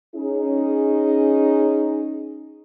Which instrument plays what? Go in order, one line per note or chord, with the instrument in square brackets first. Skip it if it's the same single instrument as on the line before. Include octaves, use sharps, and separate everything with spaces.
[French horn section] C#4 D#4 G#4